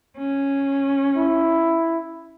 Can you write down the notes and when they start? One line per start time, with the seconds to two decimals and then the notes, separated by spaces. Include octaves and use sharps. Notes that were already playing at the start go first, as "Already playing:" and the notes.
0.18 C#4
1.17 E4